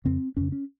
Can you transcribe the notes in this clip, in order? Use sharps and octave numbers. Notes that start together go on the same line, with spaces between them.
F2 C#3 C4
F2 C#3 C#4
C#4